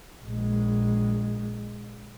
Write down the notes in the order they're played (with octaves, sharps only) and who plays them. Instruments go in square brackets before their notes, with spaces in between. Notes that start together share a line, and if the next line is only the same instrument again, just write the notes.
[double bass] A#1 G#3